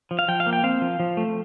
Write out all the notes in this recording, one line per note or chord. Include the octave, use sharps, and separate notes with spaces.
F3
F5
F3 G5
F5
A#3
G5
C4 F5
F3
F3
A3